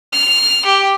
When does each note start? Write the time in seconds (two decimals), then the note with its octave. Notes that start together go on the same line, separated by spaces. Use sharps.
0.13 F6
0.65 G4